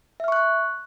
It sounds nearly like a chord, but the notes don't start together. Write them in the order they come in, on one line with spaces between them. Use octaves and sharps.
E5 F6 C#6 F#6